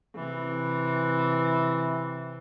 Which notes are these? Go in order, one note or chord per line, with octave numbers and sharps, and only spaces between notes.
C3 E3